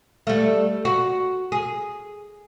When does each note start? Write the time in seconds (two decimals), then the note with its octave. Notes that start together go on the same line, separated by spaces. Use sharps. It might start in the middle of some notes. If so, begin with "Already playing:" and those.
0.27 G3 A3
0.85 F#4
1.52 G#4